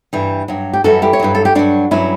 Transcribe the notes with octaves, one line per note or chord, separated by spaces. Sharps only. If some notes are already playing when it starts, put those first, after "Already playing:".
G2 E3 G3
G2 F#3
G4
F#2 E3 G3 F#4 A4
E4 G4
C#5
G2 F#3 B4
A4
G4
G2 F#3 D4 F#4
G2 F#3 C#4 E4